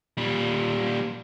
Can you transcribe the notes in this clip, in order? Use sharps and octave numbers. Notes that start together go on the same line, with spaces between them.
A#2 G3